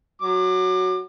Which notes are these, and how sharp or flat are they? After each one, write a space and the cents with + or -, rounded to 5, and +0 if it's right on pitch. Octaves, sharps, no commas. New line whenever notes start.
F#3 +0 D6 +30